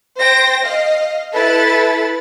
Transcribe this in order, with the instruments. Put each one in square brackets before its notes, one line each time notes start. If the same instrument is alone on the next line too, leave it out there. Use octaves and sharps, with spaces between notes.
[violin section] C5 G5 A#6
D#5 F5
E4 A4 B4 A6